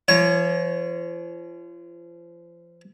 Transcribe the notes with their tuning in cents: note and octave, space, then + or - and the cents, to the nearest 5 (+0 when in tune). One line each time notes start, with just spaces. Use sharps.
F3 -35 C#5 +0